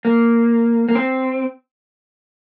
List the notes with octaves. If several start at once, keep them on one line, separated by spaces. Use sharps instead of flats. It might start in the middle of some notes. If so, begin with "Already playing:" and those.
A#3
A#3
C4